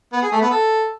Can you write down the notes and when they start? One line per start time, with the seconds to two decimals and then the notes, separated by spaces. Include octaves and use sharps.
0.13 B3
0.22 G#4
0.32 A3
0.41 B3
0.51 A4